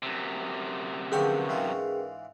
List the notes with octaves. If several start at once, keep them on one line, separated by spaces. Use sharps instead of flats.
F#2 C3
D3 F3 C#4 G#4 A#4 B4 G5 C#6
G#2 E3 F4